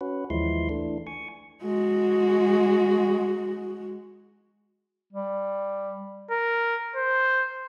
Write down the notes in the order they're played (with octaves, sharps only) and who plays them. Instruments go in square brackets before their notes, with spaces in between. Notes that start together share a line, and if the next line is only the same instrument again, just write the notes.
[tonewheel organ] C#4 F#4 B4
D#2 E3 F3 G#3 E4 C6
E3 A3 D4
G#5 C#6
[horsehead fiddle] G#3 F#4
[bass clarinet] G3
[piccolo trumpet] A#4
C5